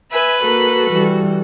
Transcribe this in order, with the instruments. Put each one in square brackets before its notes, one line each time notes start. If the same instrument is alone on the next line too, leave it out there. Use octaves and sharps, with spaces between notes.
[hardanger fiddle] B4 [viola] E5 G#5
[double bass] A#3 [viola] F#4 A4
[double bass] E3 G3